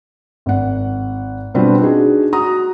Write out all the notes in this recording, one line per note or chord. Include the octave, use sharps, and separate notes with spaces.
G#1 F#5
B2 G3 C4 D4 F4 B4
D4 D#4 F#4 G#4
F#4 A#5 D#6